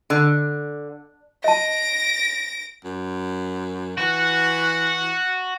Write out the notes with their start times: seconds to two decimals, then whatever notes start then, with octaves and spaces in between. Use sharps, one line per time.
0.10 D3
1.44 D#5 A5 A#6 D7
2.85 F#2
3.98 E3 F#4 F#5